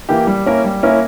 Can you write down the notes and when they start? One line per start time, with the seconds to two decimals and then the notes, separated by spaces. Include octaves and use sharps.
0.09 E3 A#3 E4 G4
0.27 G3
0.46 A#3 C#4 E4 A#4
0.65 G3
0.83 A#3 C#4 E4 A#4